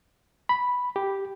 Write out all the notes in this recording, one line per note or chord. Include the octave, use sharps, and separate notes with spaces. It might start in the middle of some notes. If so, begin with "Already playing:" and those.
B5
G4